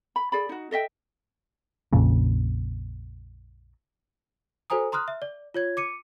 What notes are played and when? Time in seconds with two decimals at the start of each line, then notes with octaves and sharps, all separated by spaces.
0.16 B5
0.32 G#4 D5 B5
0.49 D#4 F#4
0.71 A4 D#5 E5 G5
1.93 A#1 F2 A#2 C#3
4.70 F#4 A4 C5 G#5 A#5 D#6
4.92 A#5 C6 D#6 F6 F#6
5.08 E5
5.22 D5
5.54 F4 C#5 G#6
5.77 D6 C#7 D#7